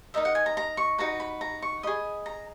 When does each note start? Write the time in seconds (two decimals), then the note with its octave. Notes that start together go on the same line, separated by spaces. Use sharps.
0.14 D#4 A#4 D#5 E5
0.25 F#5
0.35 G#5
0.46 A#5
0.57 A#5
0.77 C#6
0.98 D#4 F#4 B4 A#5
1.20 B5
1.41 A#5
1.62 C#6
1.83 G#4 D#5 B5
2.26 A#5